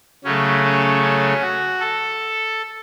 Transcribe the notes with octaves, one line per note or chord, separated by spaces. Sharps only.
C#3 F#3 A3 C#4
C#4
C#4
F#4
A4